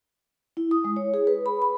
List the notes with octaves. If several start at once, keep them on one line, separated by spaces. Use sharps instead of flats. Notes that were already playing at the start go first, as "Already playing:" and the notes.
E4
D#6
G#3
C#5
G#4
B4
B5
B5